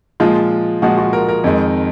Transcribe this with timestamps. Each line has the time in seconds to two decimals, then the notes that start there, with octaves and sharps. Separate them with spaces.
0.20 A#2 F3 G#3 F4
0.82 A#2 F3 G#3 F#4
0.98 F#4
1.13 A#4
1.28 A#4
1.44 F2 D#3 G#3